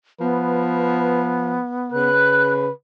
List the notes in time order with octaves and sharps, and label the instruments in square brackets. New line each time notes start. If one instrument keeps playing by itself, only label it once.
[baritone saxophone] F3 [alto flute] B3 [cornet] B4
[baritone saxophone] C#3 [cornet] B4 [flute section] F#6